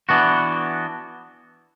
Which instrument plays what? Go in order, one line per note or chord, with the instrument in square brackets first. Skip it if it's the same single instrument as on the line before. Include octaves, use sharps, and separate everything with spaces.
[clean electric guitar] E3 B3 D4 F#4